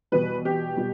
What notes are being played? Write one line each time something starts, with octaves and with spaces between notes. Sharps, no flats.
E2 B2 G3 B4
G4
B2 G3